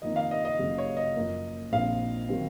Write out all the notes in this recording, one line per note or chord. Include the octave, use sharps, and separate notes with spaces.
F2 D#3 A#3 D#4 D#5
F5
D#5
D#5
F#1 F#2 C#3 F#3
C#5
D#5
F#2 F3 A#3
A#1 A#2 F3 C4 F5
D#3 F#3 C4